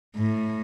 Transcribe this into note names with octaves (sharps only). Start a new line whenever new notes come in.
A2